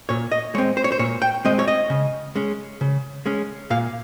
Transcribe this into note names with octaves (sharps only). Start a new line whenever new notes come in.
A#2 C#5
D#5
G#3 C4 C#5
C5
C#5
C5
A#2 C#5
G5
G#3 C4 D#5
C#5
D#5
C#3
G#3 C#4
C#3
G#3 C#4
A#2 F5